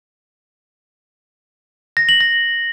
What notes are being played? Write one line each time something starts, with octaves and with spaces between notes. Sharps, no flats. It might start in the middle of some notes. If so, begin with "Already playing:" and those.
A#6
F#7
A#6